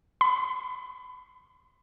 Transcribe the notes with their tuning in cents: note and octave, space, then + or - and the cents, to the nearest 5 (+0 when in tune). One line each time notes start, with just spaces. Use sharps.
B5 +30